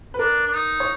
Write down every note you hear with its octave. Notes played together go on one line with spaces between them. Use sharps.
B4
D4 A#4
D4
D#4
C#5